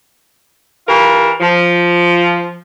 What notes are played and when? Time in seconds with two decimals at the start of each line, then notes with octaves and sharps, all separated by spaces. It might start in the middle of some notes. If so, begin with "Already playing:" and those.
0.87 E3 F4 G4 A#4
1.40 F3